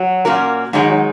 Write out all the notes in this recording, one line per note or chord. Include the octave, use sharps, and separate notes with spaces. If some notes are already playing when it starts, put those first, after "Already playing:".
Already playing: F#3
A#2 A#3 C#4 F#4 A#4
G#2 D#3 F#3 G#3 D#4
F#3